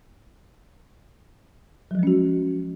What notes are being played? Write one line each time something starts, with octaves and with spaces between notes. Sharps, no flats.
F3 F#3 G#3 C#4 F#4